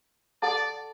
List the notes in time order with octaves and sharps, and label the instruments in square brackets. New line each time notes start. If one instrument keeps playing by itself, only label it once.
[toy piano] A4 F#5 A5 [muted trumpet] D5